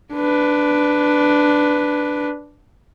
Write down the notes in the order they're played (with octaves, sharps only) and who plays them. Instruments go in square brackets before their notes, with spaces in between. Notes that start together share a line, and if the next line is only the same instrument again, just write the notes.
[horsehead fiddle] D4 B4